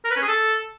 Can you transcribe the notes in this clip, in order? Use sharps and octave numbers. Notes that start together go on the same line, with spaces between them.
A#4
B4
C#4
G#4
A4